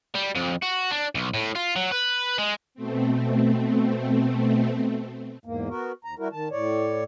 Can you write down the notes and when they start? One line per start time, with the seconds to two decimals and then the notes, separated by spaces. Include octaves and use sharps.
0.15 G3
0.35 F2
0.62 F#4
0.91 D4
1.15 B1
1.34 A2
1.55 F4
1.76 F#3
1.92 B4
2.39 G#3
2.75 B2 A3 C4
5.45 E2 G#2 A#3
5.69 B3 F#4 A#4
6.05 D#2 A#5
6.19 G3 E4 F#4 A#4
6.32 D#3 A5
6.51 A2 C#5 D5